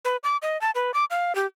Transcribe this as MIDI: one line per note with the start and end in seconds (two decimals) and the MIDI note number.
0.05 0.17 71
0.24 0.37 86
0.42 0.60 75
0.61 0.71 81
0.75 0.91 71
0.94 1.05 86
1.10 1.35 77
1.35 1.46 67